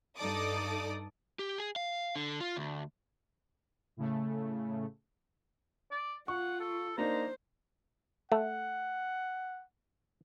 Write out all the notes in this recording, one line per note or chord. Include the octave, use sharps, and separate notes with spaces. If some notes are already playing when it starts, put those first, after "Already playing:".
G2 D#4 A4 D5 D6 D#6
G4
G#4
F5
D3
F4
D2
A2 C#3 A3
D5
F4 F#5 C#6
A4
A#3 D4 D#4 C5 A#5
A3 F#5